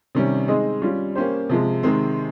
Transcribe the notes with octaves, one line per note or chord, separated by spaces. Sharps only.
C3 D#3 G3 C#4
G#3 C4 D#4 G#4 D#5
G3 C#4 F4
A#3 C#4 G4 C5
C3 F3 G#3
C3 D#3 G#3 C4